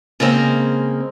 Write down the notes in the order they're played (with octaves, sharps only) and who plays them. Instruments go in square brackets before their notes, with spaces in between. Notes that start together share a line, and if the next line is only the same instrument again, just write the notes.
[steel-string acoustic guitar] C#3 G#3 A#3 C4